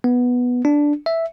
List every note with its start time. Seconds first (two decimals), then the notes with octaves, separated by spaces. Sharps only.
0.04 B3
0.65 D4
1.06 E5